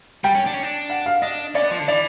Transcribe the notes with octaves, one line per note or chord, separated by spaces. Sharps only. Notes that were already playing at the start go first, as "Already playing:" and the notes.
G3 G5
C#4
D4
C#4
D4
F#5
F5
D4 D#5
C#4 D5
B3
F3
D3
E3 D5